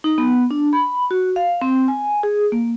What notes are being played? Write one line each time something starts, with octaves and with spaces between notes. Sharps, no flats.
D#4
B3
D4
B5
F#4
F5
C4
G#5
G#4
A#3